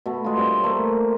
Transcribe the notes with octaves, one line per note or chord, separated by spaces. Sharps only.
B2 A3
G#3 F4
G2 C4 E5
A3 A#3